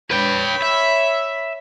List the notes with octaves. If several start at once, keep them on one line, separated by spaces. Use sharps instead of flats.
B4 C#5 G5 B5
E5